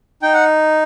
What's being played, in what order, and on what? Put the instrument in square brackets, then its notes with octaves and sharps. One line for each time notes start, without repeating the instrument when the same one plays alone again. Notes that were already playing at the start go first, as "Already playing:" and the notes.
[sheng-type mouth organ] D#4 G5
F#5